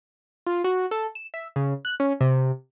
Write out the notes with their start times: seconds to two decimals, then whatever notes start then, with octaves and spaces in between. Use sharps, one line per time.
0.46 F4
0.64 F#4
0.91 A4
1.15 E7
1.34 E5
1.56 C#3
1.85 F#6
2.00 C#4
2.21 C3